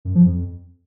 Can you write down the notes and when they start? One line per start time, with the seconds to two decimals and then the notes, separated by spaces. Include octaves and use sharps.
0.05 F#2
0.15 F3
0.26 F2